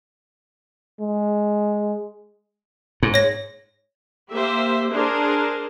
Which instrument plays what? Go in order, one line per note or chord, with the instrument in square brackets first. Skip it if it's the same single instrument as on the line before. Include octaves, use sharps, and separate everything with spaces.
[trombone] G#3
[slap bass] G#2
[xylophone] C#5 A#6
[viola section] A#3 G4 C5 E5
D4 G#4 A#4 C5